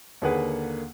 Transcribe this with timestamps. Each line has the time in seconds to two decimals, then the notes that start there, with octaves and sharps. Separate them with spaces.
0.22 D#2 D3 A#3 G#4 B4 F#5